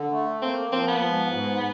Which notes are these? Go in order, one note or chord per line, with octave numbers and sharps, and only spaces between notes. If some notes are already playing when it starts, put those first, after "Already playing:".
Already playing: D3
A3
A#3 C4
F3 C4
B3
G#2
G#2